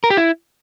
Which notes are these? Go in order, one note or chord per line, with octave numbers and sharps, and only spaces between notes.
A#4
G4
E4